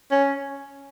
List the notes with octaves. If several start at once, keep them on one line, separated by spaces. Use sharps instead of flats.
C#4